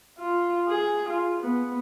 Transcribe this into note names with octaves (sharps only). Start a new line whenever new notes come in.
F4
G#4
F4
B3